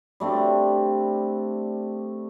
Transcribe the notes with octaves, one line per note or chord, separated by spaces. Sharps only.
G3 A3 C4 D4